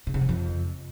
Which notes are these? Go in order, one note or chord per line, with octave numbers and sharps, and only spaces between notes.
C#3
C3
E2
F2